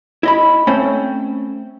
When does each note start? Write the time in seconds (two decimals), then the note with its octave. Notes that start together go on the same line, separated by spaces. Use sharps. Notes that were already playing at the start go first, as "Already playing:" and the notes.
0.23 E4 D#5 B5
0.67 A3 C4 C#4